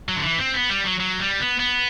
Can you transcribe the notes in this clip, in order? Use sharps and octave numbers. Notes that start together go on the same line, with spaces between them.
F#3
D3
E3
C4
B3
G3
F#3
F#3
G3
B3
B3